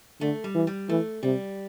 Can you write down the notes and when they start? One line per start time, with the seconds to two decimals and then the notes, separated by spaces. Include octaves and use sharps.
0.21 D3 A3
0.44 G3
0.55 E3
0.67 G3
0.89 E3 A3
1.23 C3 G3